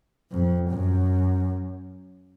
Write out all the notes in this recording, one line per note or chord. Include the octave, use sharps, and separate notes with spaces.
F2
F#2